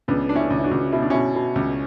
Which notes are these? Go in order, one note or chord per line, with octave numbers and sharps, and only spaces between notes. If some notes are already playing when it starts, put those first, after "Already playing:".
C#2 B3 D4
D4
C#4 E4
C#2
E4
D4 F#4
C#2
B2 E4
D4
B2 C#4 E4
B2
C#2